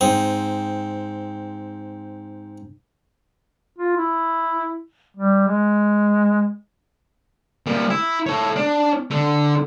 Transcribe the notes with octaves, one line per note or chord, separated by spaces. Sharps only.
G#2 C4 D#6
F4
E4
G3
G#3
G3 A#3
E4
A4 C#5
D4
D3